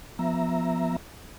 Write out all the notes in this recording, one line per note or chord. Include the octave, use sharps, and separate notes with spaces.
F3 B3 E5 A#5